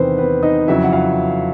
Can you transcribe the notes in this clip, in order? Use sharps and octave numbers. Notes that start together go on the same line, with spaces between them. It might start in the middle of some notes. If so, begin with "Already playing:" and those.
Already playing: E2 C3 D#3 B3 C4 B4 C5
B3 B4
D#4 D#5
F2 C#3 F#3 E4 E5
F#5
F4 F5